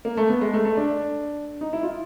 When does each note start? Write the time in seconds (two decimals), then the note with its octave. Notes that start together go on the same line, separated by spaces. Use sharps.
0.05 A#3
0.17 A3
0.30 B3
0.41 G#3
0.53 A3
0.65 A3
0.77 D4
1.61 D#4
1.73 E4
1.83 F4